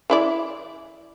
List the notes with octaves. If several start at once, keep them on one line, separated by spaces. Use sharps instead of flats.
E3 E4 D5